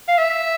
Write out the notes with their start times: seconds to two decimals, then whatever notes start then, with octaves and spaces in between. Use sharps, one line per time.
0.08 F5
0.18 E5